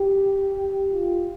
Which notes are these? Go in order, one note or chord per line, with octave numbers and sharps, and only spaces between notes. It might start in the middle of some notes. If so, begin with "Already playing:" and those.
Already playing: G4
F4